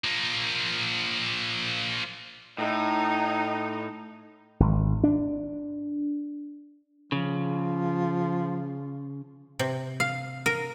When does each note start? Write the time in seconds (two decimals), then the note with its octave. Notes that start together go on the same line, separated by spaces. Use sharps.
0.04 F3 A#3
2.58 A2 D#4
4.60 G#1
5.04 D4
7.12 C#3 F3
9.59 C3
10.00 F5
10.46 A#4